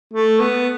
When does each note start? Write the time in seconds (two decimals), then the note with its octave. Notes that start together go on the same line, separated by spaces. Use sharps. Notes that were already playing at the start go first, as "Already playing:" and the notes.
0.13 A3
0.40 B3